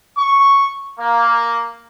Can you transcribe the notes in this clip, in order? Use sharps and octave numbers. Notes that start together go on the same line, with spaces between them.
C#6
A#3